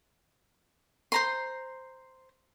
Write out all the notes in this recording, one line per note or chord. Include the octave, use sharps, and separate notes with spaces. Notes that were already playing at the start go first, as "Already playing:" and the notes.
C5 A#5 C6